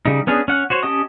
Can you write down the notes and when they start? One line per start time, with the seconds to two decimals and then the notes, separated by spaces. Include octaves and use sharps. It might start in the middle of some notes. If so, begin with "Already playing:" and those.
0.06 C#3 G3 D#4
0.27 B3 C#4 D4 G#4
0.48 C#4 F#5
0.70 F#4 C5 C#5
0.83 C#4 G4 D#5 A5 D#6